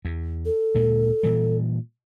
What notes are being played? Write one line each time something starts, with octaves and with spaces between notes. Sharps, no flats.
E2
A4
D2 A#2 G#3
A#2 E3 G3